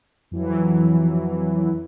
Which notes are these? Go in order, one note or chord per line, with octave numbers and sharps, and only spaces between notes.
F2 E3 F#3